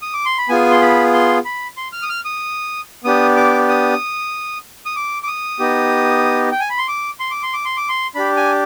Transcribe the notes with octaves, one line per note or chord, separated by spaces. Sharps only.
D#6
D6
C6
B5
B3 F4 G#4 G#5
C6
B5
C6
B5
C6
F6
D#6
F6
D#6
B3 D4 G4 D#6
D6
D#6
D#6
D6
D6
D#6
B3 D#4 G4
G5
G#5
B5
C6
D6
C6
D6
C6
D6
C6
D6
C6
D4 G4 B5
G#5